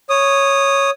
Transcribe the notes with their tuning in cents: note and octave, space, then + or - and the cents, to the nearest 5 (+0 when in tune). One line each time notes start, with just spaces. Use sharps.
C#5 +0 D#6 -10